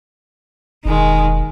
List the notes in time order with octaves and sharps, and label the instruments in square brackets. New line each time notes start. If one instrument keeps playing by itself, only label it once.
[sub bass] E1 [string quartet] D#3 G#3